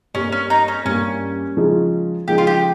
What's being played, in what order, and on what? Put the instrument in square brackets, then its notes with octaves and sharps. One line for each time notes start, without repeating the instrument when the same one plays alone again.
[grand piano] G2 G3 A#3 [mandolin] C#4
[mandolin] C#4
D#4
C#4
[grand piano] G2 G3 A#3 [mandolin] C#4
[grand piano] C#3 F3 G#3 D#4 G#4
[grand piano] C#3 F3 G#3 D#4 G#4 [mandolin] G4
[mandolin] F4
G4